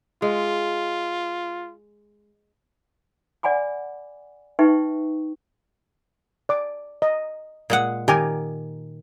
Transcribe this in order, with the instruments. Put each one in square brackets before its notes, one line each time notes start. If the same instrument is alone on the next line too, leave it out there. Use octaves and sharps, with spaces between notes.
[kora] G#3 [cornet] F4
[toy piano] D5 F#5 G#5 B5 D6
D#4 B4 E5 G5 C#6
[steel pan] D5 D6
D#5
[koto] A#2 G#3 F#5
[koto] D#3 A#4 [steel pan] G4 G#5 D6